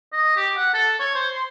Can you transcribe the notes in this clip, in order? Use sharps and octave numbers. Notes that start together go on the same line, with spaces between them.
D#5
G4
F#5
A4
C#5
C5
C6